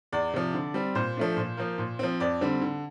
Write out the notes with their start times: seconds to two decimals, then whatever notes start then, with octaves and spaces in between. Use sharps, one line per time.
0.13 E2 D5
0.34 C3 F3
0.53 D3
0.74 G3 C4
0.95 A#2 C5
1.17 F3 A3 D4
1.37 A#2
1.57 F3 A#3
1.78 A#2
1.99 F3 C4
2.20 F2 D5
2.41 D3 G3 C4
2.61 D3